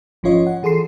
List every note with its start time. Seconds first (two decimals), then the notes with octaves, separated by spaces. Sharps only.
0.23 G#1 F3 C#4 F4 C#5 D#5
0.47 F#5
0.63 E3 G#4 A4 C6 C7